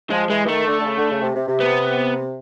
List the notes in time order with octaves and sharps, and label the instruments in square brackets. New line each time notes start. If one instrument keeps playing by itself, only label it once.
[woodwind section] F3 [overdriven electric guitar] G#3
[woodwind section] E3 [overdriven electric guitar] G#3
[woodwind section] E3
[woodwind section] D#3 [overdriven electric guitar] A3
[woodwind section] D3
D3
C#3
D3
C#3
C3
C3
C3
[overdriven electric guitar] B3